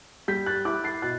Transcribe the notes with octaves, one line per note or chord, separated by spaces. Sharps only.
G3 G6 B6
F#6 A6
E4 D6 F#6
A6 C7
B2 F#6 A6